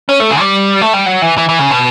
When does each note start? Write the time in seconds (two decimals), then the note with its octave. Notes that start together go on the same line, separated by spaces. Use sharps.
0.09 C#4
0.20 A3
0.31 C#3
0.40 G3
0.82 A3
0.93 G3
1.06 F#3
1.22 E3
1.38 E3
1.49 E3
1.59 C#3
1.71 B2